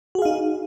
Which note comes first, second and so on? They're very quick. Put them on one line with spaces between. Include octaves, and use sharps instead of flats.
F#4 G#4 F5 D#4